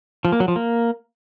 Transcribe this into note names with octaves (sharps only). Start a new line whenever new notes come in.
F3
A#3
F#3
F3
A#3